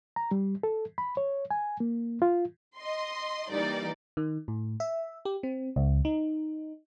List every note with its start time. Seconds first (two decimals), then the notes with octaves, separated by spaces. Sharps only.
0.16 A#5
0.31 G3
0.63 A4
0.98 B5
1.17 C#5
1.51 G#5
1.80 A#3
2.22 F4
2.78 D#5 C6
3.50 E3 G3 A#3 D#4 D5
4.17 D#3
4.48 A2
4.80 E5
5.25 G4
5.43 C4
5.76 C#2
6.05 D#4